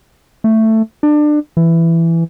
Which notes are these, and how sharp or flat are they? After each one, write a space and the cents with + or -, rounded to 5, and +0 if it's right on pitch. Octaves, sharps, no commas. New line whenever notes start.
A3 +10
D4 +25
E3 +10